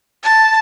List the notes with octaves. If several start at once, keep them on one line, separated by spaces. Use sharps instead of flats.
A5